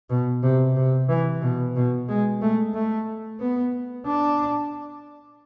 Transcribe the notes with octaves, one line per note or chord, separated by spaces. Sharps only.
B2
C3
C3
E3
B2
B2
G#3
A3
A3
B3
D4